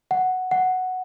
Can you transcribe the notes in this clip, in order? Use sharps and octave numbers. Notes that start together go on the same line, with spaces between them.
F#5
F#5